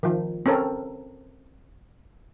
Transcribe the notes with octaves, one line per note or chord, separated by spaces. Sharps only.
D#3 F3
C4 C#4 A4 A#4